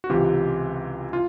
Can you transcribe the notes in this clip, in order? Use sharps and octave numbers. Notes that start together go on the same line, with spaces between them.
F#4
C#2 C3 E3 F4 G4
F4